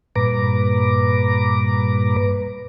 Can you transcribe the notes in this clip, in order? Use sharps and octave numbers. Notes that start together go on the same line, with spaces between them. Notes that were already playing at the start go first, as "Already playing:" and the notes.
G2 A#2 B4 A#5 D6